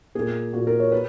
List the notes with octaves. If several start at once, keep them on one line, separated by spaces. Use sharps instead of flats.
A#2 A#3 G#4
A#2 A#3 F#4
A#4
C#5
B4